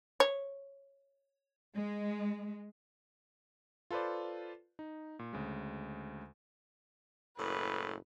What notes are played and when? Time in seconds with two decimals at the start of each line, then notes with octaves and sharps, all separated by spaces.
0.20 C#5
1.76 G#3
3.91 F4 A4 B4 C5 D5
4.79 D#4
5.19 A#2
5.33 D2 C#3 G#3
7.38 F#1 A2 B4